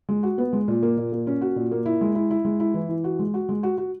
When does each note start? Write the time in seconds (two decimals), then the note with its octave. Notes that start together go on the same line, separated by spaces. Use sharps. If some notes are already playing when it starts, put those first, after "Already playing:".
0.09 G#3
0.23 F#4
0.38 B3
0.53 G#3
0.68 A#2
0.83 A#3
0.97 A#2
1.12 A#3
1.27 C#4
1.41 F#4
1.56 A#2
1.71 A#3
1.85 E4
2.01 G#3
2.15 E4
2.30 E4
2.45 G#3
2.60 E4
2.74 E3
2.89 E3
3.04 F#4
3.19 G#3
3.34 F#4
3.49 G#3
3.63 F#4
3.78 F#4